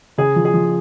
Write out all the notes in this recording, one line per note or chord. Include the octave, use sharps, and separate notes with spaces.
C#3 G#4
F3
G#4
F3